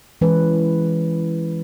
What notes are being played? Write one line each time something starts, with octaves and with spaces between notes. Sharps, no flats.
E3 G#3 C#4 B4